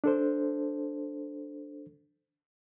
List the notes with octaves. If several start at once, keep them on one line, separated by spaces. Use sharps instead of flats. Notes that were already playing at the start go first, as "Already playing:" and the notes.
D4 A4 C5